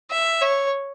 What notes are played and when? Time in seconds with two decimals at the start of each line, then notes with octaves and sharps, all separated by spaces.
0.11 E5
0.41 C#5